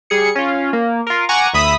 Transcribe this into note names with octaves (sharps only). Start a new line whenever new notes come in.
G3 G#4 C#7
C#4 F4
A#3
F4 A#4
F#5 G#5 A#5 C#6 D6
D2 E5 B5 D#6 B6